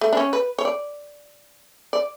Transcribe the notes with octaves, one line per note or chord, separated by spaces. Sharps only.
A3
D4
C#4
B4
C#5
D5
D5